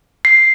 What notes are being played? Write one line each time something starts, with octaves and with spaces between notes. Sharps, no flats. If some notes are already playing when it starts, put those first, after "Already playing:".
C7